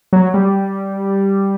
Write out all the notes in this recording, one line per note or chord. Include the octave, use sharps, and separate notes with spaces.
F#3
G3